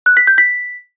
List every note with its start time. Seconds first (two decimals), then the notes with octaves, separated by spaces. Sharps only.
0.06 F#6
0.17 B6
0.27 G6
0.38 B6